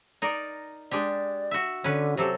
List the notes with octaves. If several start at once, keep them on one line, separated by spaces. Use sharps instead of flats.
D#4 A#4 D5
G#3 D4 G4 D5
F#4 E5
D3 C#4 B4
C3 F#3 G4 A4